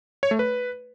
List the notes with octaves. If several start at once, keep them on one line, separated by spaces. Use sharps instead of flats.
C#5
A3
B4